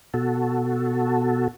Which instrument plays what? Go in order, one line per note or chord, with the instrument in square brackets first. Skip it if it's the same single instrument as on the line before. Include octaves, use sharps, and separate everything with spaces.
[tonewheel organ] B2 F#4 A4